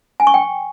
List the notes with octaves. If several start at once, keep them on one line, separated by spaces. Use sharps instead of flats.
G#5
C#6
G5